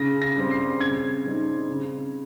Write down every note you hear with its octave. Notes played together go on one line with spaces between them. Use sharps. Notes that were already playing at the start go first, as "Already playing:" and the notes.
Already playing: C#3 A#6
A#6
G3 C4
C7
C#3 G#6
G3 C4 D#4
C#3